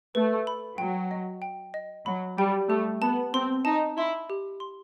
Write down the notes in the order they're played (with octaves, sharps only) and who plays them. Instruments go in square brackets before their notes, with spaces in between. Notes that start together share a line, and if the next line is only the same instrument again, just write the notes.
[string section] A3 [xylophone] B4
[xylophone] B5
[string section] F#3 [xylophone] G5
[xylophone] D#5
G5
D#5
[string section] F#3 [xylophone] B5
[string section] G3 [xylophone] G5
[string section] A3 [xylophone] G4
[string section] B3 [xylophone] A5
[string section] C4 [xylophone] C6
[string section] D#4 [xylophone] A5
[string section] E4 [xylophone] C6
[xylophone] G4
C6